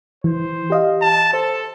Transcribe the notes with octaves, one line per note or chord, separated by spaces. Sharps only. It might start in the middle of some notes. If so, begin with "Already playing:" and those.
E3 C5
G4 D#5 F5
A5
A4 C5